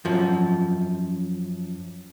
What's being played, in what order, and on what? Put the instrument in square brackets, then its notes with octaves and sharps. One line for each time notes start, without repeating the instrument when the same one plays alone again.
[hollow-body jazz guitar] F#2 F3